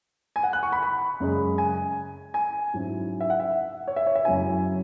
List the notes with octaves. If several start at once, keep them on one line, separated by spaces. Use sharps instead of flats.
G#5
F#5
F#6
C#6
B5
B5
F#2 C#3 G#3
G#5
G#5
G#2 F#3 C#4 E4
E5
F#5
E5
C#5
E5
C#5
E5
F#2 C#3 F#3 C#4 E4 G#5